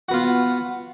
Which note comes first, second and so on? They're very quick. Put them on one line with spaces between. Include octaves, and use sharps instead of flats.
F#4 B3 F4